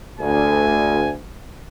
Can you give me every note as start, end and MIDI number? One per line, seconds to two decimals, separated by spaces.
0.20 1.13 38
0.20 1.13 80